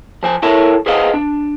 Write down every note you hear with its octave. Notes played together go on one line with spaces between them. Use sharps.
F3 C5 G#5
E4 A4 A#4 C#5 E5 A5
G#4 B4 C5 D#5 F5 F#5
D4